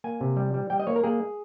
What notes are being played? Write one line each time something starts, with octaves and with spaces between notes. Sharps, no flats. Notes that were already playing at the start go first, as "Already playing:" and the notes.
A#3 G#5
C3
G3
G3
G3 G5
D#5
A#3 C#5
A#4
A#3 G#4